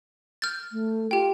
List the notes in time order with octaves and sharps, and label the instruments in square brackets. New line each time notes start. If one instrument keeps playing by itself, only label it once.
[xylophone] F6 G6 A6
[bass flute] A3
[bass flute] F4 [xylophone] G4 G5